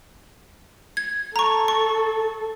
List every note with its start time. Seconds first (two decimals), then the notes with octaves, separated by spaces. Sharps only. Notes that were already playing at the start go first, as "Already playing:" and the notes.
0.97 G#6
1.36 A4 A#5 C#6
1.68 C#6